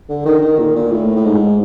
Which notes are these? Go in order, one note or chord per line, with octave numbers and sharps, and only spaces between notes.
D3
D#3
D#3
A#2
A#2
A2
A2
G#2